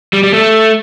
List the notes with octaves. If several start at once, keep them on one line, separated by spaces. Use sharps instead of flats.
G3
G3
A3